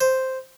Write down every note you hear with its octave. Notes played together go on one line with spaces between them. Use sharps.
C5